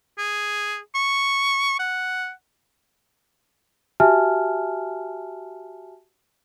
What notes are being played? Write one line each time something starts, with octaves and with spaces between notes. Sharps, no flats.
G#4
C#6
F#5
F#4 G4 E5 G#5 A5 F6